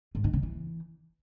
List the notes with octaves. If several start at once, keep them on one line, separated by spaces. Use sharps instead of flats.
G#2
D#3
C#3
E3